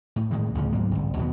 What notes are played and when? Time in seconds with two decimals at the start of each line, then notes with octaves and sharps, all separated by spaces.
0.16 A2
0.31 A2 D#3 G#3
0.55 A1 D2 C#3 F3
0.73 G#2 F#3 A#3
0.91 G1 C2
1.17 D#2 B2 A3 B3